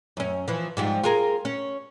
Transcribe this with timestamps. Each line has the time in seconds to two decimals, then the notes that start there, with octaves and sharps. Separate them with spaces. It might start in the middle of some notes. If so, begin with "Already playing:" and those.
0.17 F#2 C#4
0.48 E3 F3
0.77 G#2 F3 G3
1.04 F4 G#4 A#4
1.45 C#4